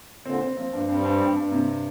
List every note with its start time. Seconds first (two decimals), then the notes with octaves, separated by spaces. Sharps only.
0.25 A#2 D3 C4
0.41 C4
0.57 F3 A#3 C4
0.73 G2 F3 A#3
0.88 G2 G3 C4
1.05 G2
1.20 G2
1.36 G2
1.52 C3